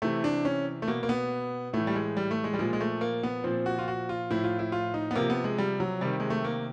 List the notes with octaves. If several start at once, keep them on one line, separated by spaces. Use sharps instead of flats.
C3 E3 A3
D4
C#4
A3
B2 A#3
A#3
B3
A2 E3 A3
G3
G#3
G3
A3
G#3
G3
A#2 F3 G#3
G#3
A3
A#3
B3
A#2 F3 C4
F#4
F4
F#4
F4
A2 F3 E4
F4
E4
F4
D#4
B3
C3 F3 A#3
B3
G#3
G3
F#3
C3 D#3 G3
G#3
A3
A#3